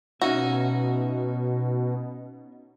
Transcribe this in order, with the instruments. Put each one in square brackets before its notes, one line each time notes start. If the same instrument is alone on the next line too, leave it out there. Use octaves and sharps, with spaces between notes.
[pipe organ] B2 [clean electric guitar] C#4 D#4 E5 [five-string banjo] F#4